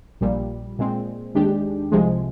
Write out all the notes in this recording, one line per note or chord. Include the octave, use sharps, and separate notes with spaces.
A#1 A#2 G3
A#2 G#3 C4
D#2 D#3 G#3 D4 G4
C2 C3 F3 G#3